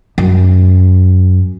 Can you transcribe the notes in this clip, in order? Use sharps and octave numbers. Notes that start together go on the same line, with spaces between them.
F#2